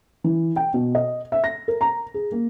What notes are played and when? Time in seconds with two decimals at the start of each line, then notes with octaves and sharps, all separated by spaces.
0.24 E3
0.56 G5
0.74 B2
0.95 D#5
1.32 E5
1.44 A#6
1.68 A#4
1.81 A#5
2.14 G#4
2.32 A#3